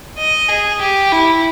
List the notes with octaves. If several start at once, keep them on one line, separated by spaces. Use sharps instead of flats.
D#5
G#4
G4
E4